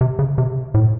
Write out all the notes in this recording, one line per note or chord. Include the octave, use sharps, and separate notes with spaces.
C3
C#3
C3
A2